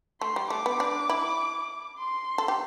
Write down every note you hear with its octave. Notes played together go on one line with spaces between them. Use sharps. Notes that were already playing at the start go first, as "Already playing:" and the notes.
A3 C6
G3
A3 D6
B3
D4
E4
C6
A4
G4